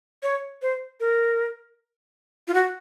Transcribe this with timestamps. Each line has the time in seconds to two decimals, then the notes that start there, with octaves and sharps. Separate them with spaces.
0.23 C#5
0.62 C5
1.00 A#4
2.48 F4
2.54 F#4